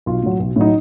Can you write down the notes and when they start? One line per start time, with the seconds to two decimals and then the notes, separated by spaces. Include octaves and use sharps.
0.06 B1 F4
0.23 A2 F#3
0.39 B1
0.56 A2 F#3 D#4